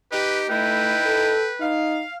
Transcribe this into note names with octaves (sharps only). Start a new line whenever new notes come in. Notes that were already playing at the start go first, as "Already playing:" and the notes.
D#4 G4 B4
A3 D#4 E4 B4 G5
A4
D#4 F5